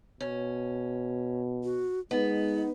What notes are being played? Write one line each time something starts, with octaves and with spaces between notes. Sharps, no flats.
B2 C#4
F#4
G#3 B3 D#4